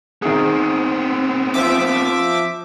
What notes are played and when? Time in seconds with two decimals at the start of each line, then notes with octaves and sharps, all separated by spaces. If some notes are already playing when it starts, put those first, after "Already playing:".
0.22 D#3 B3 C4 G#4
1.54 F3 E5 D6